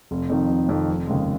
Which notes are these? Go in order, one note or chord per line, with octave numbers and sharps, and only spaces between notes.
F1
F2 D#3
F1
F2 D#3
F1
D#2 C#3 G#3